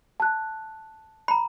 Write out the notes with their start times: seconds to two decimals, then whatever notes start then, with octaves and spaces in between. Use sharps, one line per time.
0.20 A5 F#6
1.28 A#5 B5